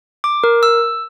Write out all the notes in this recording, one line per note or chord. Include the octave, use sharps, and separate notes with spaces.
D6
A#4
E6